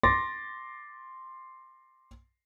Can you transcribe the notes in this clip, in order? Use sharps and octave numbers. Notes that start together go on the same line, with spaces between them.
C6 D6 A6 A#6